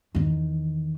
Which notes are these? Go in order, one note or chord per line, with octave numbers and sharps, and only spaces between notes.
E2 D#3